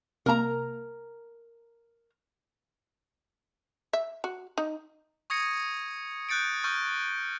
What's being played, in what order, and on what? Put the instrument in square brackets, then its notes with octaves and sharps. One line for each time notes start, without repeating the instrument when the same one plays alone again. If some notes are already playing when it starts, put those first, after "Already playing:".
[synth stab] C2 A#3 [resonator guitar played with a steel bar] A#4 A#5
[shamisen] E5
F#4
D#4
[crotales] C#6 D#6 G#6 A#6 C#7 D#7
F#6 G6 A6 C#7 D7
C#6 F6 G6 A6